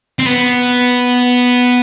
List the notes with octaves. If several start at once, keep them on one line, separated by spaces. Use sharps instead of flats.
C4
B3